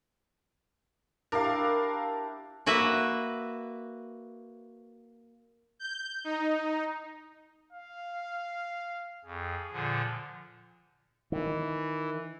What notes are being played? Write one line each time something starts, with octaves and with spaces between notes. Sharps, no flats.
D4 E4 G4 A#4 F5
A#3 F#4 B4 E5
G6
D#4
F5
F2 G#4
A#2 D3 F3
D#3 E3